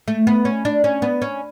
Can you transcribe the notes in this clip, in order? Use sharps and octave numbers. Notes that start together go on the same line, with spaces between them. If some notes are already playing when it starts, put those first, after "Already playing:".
A3
B3
C#4
D4
C#4
B3
C#4